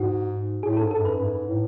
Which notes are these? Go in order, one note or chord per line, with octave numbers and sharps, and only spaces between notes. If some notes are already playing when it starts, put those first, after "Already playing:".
Already playing: G#2 F#4
A2 G#4
G#2 A4
A4
F#2
B4
G#2
A2